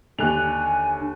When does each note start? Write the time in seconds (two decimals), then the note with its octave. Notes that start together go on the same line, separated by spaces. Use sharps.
0.19 D#2 D3 G#5 F#6 F7